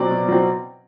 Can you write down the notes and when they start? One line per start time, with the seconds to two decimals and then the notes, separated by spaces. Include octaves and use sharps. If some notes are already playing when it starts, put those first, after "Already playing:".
Already playing: B2 F#3 C4 D5
0.10 B2
0.28 F#3 C4